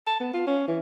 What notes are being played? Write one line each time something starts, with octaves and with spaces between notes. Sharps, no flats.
A5
B3
F4
C#4
E3